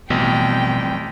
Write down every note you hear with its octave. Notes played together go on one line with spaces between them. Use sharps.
A1 F2 B2 G3 G5